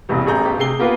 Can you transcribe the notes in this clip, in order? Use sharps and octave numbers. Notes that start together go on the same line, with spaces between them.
E1 A1 E2 C3 G3
A1 G#4 A#5 G6
G1 G4
C3 G#4 C7 G7
A#3 B3 F4 G4 B4